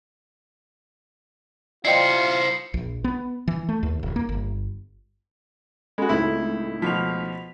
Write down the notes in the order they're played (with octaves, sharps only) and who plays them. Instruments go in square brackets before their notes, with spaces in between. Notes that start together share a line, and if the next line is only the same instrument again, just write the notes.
[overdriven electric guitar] E4 C5 [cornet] F4 [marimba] D5 D#5 G5 [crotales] C7 C#7
[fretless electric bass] A#1
B3
E3
A3
D#2
D#1
A#3
G1
[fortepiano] G#3 F#4 [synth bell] C#4 A4 B5
[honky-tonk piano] C#2 A2 D#4 [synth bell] C4 [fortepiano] E4
[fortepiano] B2 F3 [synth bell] B6 F7